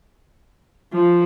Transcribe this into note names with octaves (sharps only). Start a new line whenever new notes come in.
F3